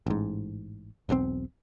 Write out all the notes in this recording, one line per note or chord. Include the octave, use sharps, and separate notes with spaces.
A1 G#2
E1 B1 B2 C4